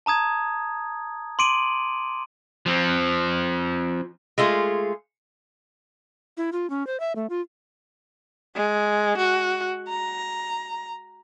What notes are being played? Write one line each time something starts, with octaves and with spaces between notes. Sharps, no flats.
A5 A#5 D#6 G#6
C6 D6 D7 D#7 F#7
F3 C4
G#3 A3 F4 G#4
E4
F4
C#4
C5
E5
A3
F4
G#3
F#4
A#5